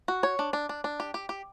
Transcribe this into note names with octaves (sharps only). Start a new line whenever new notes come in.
F#4
C#5
D4
D4
D4
D4
G4
G4
G4